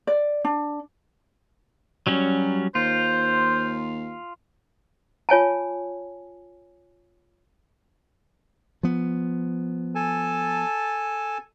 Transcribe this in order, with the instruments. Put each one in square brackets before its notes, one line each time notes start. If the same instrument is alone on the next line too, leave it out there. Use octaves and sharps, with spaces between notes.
[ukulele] D5
D4
[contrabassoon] F#2 [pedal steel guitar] F#3 G3 C#4
[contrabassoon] D#2 [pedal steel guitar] F4 [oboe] C5
[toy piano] F4 C#5 G#5 A5
[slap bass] F3 B3
[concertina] A4 G#5 A5